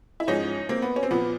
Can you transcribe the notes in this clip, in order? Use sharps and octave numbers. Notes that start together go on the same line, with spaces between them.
E4
G#2 F3 C#4 D#4
A#3 C4
B3
C#4
C4
A#2 F3 B3